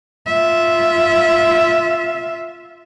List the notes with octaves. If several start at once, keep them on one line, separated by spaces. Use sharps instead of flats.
F4 E5